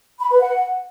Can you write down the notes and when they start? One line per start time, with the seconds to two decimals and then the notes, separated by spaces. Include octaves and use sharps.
0.20 B5
0.30 B4
0.40 F#5